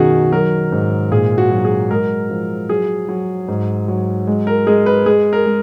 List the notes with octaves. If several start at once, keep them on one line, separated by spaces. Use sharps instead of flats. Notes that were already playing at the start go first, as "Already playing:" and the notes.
Already playing: F#2 B2 D#3 F#4 G#4
F#3 A#4
G#2
A#2 G#4
F#4
F#3
G#4
G#3 A#4
F3
F#3 G#4
F#3
G#2
F#3
G#3
A#4
G#3 G#4
B4
G#3 G#4
A#4
G#3